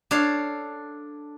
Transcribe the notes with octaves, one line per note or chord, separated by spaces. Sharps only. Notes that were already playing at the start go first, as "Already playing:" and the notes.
D4 A4 C#5 F5